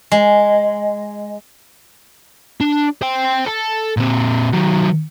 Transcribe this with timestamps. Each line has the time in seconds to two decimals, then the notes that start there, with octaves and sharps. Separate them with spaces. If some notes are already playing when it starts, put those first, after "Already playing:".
0.12 G#3
2.61 D4
3.02 C5 G5
3.46 A4
3.97 A#2 C4
4.53 D#3 F#3